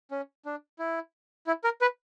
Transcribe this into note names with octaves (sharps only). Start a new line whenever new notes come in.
C#4
D4
E4
E4
A#4
B4